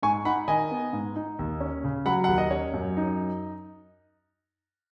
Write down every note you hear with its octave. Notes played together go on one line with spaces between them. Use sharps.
G#2 G#5 C#6
D#4 F#5 B5
D#3 D#5 G#5
B3
G#2
D#4
D#2
C#4
C#3
F#3 F#5 B5
D#2 F#5
D#5
C#4 C#5
F#2
D#4